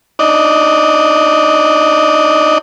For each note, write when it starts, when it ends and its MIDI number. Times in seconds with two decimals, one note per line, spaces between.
0.19 2.58 62
0.19 2.58 63
0.19 2.58 74
0.19 2.58 75